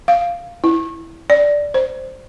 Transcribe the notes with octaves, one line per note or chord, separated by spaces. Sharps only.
F5
E4
D5
C5